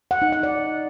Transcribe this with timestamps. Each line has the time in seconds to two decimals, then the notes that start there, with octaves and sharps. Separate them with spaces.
0.11 F#5
0.22 D#4
0.32 F#5
0.43 D5